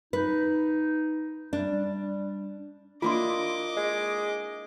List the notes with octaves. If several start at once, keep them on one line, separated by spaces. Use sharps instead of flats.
D#4 B4
G3 D4
A#3 D4 E4 F4 D#5 C6 D6
G#3